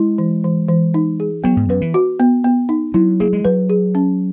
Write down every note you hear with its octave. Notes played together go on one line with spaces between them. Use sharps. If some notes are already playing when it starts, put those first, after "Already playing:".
Already playing: G#3 E4
E3
E3
E3
D#4
G#4
F#3 B3
G#2
F#2 B4
E3
F#4
B3
B3
D#4
F#3 E4
A#3 G#4
G#3
F#3 B4
G#4
C#4